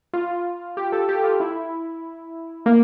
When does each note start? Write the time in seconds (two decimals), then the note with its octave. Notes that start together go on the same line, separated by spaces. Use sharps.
0.14 F4
0.77 G4
0.92 A4
1.09 G4
1.24 F4
1.40 E4
2.66 A#3